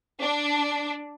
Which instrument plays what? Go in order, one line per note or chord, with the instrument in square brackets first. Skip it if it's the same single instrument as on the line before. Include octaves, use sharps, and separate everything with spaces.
[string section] D4